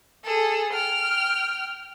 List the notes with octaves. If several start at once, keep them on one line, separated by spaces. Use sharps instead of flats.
G#4 A4
G5 F6